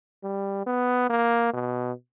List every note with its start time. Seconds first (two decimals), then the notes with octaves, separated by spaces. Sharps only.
0.23 G3
0.66 B3
1.10 A#3
1.53 B2